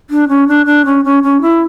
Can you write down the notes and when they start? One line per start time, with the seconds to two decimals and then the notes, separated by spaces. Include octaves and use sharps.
0.10 D4
0.28 C#4
0.48 D4
0.66 D4
0.85 C#4
1.05 C#4
1.23 C#4
1.41 E4